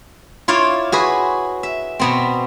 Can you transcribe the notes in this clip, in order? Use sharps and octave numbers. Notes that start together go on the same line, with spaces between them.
E4 F4 C#5 D5 F5
F#4 G#4 B4
E5
B2 B3 C4